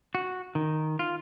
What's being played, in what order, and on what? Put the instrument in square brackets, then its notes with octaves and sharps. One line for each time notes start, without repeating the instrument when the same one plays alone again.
[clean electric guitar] F#4
D#3
F4